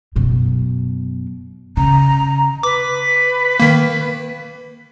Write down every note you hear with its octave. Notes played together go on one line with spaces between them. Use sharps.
F#2 B2
C#3 A#5
B4 D6
D#3 A#3